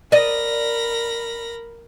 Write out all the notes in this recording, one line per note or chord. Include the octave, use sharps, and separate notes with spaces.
A#4 D5 D#5 B5 A#6